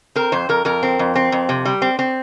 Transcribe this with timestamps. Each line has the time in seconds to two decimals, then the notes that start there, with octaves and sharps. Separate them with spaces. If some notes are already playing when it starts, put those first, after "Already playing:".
0.16 C4 A#4
0.32 F2 C5
0.49 F2 A#4
0.65 F2 A#4
0.83 C4
0.99 F2
1.15 C4
1.32 F2
1.49 C3
1.65 G3
1.82 C4
1.99 C4